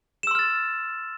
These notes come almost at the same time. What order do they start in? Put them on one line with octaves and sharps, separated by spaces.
E7 E6 C6 F6 A6